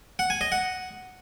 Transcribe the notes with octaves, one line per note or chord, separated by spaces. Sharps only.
F#5
G#5
D#5
F#5